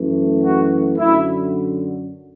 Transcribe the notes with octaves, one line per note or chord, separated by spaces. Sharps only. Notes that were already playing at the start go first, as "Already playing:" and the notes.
Already playing: F#2 E3 A3
F#4
F#2 D3 F#3 E4